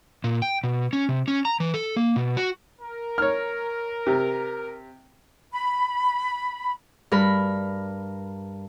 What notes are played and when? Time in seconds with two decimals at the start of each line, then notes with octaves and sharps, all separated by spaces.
0.24 A#2
0.42 G5
0.64 B2
0.93 C#4
1.09 C3
1.28 C#4
1.45 A#5
1.60 E3
1.74 A4
1.96 A#3
2.16 B2
2.37 F#4
2.80 A#4
3.18 C#5 F6
4.07 C3
5.52 B5
7.12 G2 A#4 B5